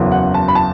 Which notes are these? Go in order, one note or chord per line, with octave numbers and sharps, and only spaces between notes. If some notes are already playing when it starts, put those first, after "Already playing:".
Already playing: F#1 E2 C#3 F#3
F#5
A5
B5
A5